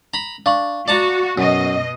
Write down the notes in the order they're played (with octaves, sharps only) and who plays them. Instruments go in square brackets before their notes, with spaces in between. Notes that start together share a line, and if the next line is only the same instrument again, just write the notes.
[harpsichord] A#5 B5
[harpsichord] D4 [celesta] F5 C#6 F#7
[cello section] F#4 [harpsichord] D5 A5 A#5
[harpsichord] F#2 [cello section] B2 D#5